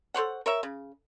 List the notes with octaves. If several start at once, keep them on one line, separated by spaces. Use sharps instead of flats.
A4 C5 C#5 F#5
A#4 C#5 E5
C#3